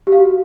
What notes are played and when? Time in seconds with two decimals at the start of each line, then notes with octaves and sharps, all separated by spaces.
0.07 G4
0.12 F5
0.17 F#4